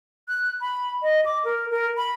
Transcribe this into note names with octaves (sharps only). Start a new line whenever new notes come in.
F#6
B5
D#5
D6
A#4
A#4
B5